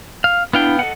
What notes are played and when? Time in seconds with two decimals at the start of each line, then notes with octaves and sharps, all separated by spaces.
0.24 F5
0.53 B3 D4 E4 F5 G5
0.79 A4 D#5 F#5